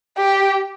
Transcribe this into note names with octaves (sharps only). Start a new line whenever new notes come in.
G4